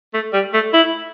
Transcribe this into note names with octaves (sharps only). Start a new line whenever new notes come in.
A3
G3
A3
E4